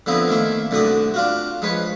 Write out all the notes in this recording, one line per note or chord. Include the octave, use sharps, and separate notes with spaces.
D3 F3 B3 C4 E4
D#3 A3 A#3 E4
C2 D3 A3 F#4 D6 D#6
D4 F4 F#4
F3 G#3 B4 C#5